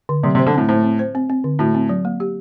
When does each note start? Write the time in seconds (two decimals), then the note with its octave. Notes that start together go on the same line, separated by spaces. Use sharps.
0.09 D3
0.23 C3 F#3
0.35 C3
0.39 C5
0.47 D3
0.55 A2 C4
0.69 A2 C5
0.84 C4
0.99 C5
1.15 C4
1.30 C4
1.44 D3
1.59 A2 F#4
1.75 C4
1.89 F#3
2.05 A#3
2.20 G4